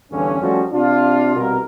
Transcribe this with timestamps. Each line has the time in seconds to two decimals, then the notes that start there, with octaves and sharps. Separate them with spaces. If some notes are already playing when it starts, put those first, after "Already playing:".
0.12 E2 G2 D3 C#4
0.41 F3 G3 A3 C#4 F#4
0.72 C3 D4 F4
1.36 C2 B2 A#4